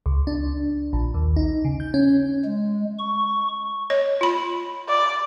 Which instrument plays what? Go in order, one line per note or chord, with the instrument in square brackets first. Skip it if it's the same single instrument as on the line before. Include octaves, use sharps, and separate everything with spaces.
[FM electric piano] C#2
D4
A#1
D#2
D#4
C#3
G6
C#4
[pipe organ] G#3
C#6
[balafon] C#5 D#5
F4 B5
[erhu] D5